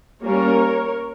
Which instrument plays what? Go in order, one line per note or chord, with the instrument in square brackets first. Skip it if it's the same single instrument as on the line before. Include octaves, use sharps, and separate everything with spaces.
[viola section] G3 A#3 C#4 A#4 C#5